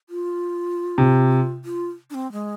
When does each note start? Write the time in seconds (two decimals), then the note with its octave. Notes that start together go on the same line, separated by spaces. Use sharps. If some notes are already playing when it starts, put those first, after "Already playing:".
0.10 F4
0.98 C3
1.65 F4
2.10 D4
2.14 C4
2.32 G#3